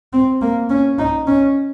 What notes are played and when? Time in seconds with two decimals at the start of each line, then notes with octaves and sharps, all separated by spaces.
0.13 C4
0.42 A#3
0.70 C#4
0.99 D#4
1.27 C#4